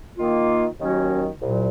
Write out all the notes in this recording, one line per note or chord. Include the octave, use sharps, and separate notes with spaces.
D#3 A#3 F4
D#2 D#3 F#3 C#4 F#4
C2 A#2 F#3